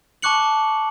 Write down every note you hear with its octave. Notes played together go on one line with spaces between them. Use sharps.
A5 C#6 D6 F#6 C#7 F#7